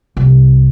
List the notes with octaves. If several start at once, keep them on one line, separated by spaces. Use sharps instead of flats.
C2